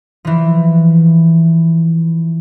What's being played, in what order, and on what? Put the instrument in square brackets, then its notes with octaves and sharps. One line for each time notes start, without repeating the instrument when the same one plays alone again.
[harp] E3 F3